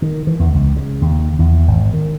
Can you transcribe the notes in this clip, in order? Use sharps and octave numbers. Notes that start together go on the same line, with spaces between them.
D#3
E3
E2
C#2
C#3
D#2
E2
G#1
D#3